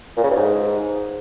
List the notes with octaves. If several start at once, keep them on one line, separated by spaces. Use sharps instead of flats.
A#2
C#3
G2
G#2